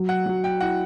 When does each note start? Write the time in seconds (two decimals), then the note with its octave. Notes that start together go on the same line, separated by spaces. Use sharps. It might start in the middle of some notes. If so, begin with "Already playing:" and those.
Already playing: F#3
0.09 F#5
0.26 F#3
0.44 G5
0.61 E4 F#5